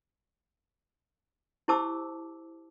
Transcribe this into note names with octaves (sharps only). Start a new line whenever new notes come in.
E4 G4 C5 A5 D6 E6